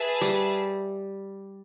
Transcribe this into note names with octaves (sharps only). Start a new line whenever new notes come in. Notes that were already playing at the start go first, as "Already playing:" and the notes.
Already playing: G#4 B4 E5 A5
G3